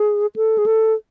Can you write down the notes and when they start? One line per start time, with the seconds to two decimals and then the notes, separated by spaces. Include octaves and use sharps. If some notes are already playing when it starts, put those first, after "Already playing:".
Already playing: G#4
0.36 A4
0.58 G#4
0.66 A4